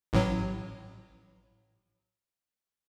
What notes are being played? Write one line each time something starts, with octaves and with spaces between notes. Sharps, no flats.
A1 A2 F#3